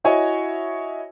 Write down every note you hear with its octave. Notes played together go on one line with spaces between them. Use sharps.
E4 F#4 C#5 D#5 E5 G#5